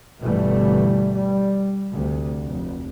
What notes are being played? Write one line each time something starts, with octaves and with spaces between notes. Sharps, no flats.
G1 B2 E3 G3 A3
G3
D2 C3
F1